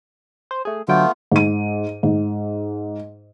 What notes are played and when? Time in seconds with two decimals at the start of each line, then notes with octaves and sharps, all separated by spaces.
0.51 C5
0.65 A3 G#4
0.88 D3 F#3 A3 B3 F4 G5
1.32 G#2 D#7
2.03 G#2